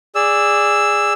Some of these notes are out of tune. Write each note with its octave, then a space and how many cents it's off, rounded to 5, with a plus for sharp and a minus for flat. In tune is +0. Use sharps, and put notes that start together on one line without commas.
G#4 -15 D5 +0 E6 +0